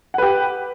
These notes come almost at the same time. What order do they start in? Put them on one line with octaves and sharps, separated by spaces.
F#5 B4 G4